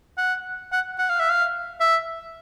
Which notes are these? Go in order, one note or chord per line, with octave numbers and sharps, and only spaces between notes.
F#5
F#5
F#5
F5
E5
F5
E5